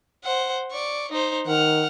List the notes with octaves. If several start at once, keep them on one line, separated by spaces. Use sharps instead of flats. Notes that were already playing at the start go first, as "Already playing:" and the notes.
C5 F#5
D5 C#6
D#4 C5
D#3 F#5 F6